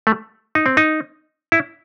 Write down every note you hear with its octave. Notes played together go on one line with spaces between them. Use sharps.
A3
D#4
C4
D#4
E4